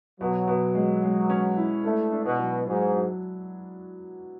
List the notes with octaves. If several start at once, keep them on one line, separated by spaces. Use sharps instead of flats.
B2 F#3
B2
G#3
G#3
C#4
E4
A3 D4
D4
B2
F#3
G#2 F#3
F#3